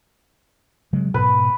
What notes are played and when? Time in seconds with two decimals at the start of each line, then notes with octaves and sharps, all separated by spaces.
0.93 C#3 F#3 G#3
1.14 G#2 B2 B4